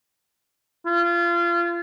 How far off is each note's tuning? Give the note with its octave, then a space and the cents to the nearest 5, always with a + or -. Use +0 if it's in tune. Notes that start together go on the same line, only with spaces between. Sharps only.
F4 -25